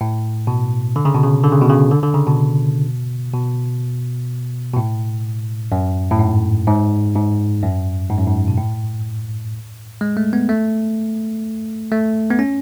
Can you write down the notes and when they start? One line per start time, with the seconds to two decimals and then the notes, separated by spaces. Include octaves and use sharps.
0.01 A2
0.47 B2
0.96 D3
1.05 C#3
1.14 B2
1.23 C#3
1.43 D3
1.52 C#3
1.61 B2
1.69 C#3
1.91 D3
2.03 D3
2.14 C#3
2.27 B2
3.34 B2
4.73 B2
4.77 A2
5.72 F#2
6.11 A2
6.19 G#2
6.67 G#2
7.15 G#2
7.63 F#2
8.10 G#2
8.18 F#2
8.27 G#2
8.48 B2
8.58 A2
10.01 G#3
10.17 A3
10.33 B3
10.49 A3
11.92 A3
12.31 B3
12.39 C#4